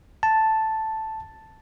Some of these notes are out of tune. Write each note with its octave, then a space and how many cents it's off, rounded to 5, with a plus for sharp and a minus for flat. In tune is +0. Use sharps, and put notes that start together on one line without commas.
A5 +0